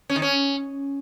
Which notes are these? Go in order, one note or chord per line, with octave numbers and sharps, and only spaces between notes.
C#4
D#3
C#4